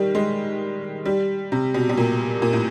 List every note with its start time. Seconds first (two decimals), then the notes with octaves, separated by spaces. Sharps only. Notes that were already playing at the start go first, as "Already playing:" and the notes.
Already playing: D#3 G3
0.15 G#3
1.06 G3
1.52 C3
1.74 B2
1.89 B2
1.98 A#2
2.42 A#2
2.53 A2